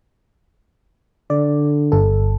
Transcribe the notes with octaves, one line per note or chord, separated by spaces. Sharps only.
D3 D5
G1 A4